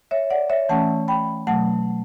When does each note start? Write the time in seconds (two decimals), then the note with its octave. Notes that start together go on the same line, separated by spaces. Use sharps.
0.11 C#5 E5
0.30 D5 F#5
0.50 C#5 E5
0.69 E3 A3 C#4 F#5 A5
1.08 G5 B5
1.47 B2 F#3 A3 F#5 A5